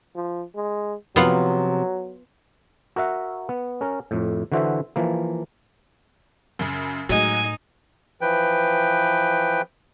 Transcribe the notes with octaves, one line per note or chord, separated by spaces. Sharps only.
F3
G#3
C3 F3 F#3 B3 F4 F#5
F#4 A#4 E5 F#5
B3
C#4 A#4
F2 A2
D3 E3 F#4 C5 E5
E3 F3 A#3
F#2 C#3
A2 F#3 G#3 D#4 G#5
E3 F3 B4 G5